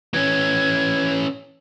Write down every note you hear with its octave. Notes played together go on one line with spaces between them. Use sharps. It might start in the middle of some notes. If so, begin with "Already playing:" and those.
E3 C#4 G#6